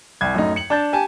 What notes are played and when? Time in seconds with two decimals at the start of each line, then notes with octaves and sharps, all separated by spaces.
0.21 C2 G#6
0.35 F#2 A2 D#4
0.56 C#7 F#7
0.70 D4 A5 G6 A6
0.93 G4 G#5 A5